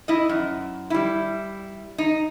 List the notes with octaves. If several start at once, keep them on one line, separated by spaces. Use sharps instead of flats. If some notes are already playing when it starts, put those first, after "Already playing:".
E4 D#5
F#2
G3 E4
D#4